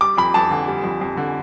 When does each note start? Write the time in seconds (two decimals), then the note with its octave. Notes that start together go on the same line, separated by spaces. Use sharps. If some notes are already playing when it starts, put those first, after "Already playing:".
0.01 G3 D6
0.17 F2 B5
0.34 F2 A5
0.51 D3
0.68 G3
0.84 F2
1.01 F2
1.17 D3